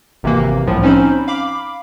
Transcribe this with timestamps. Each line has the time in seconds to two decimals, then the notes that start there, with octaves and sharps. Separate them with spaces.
0.23 G#1 C3 E3 A#3
0.67 C2 A2 F3
0.83 C4 C#4 D#4 C5 B5
1.28 F5 B5 D6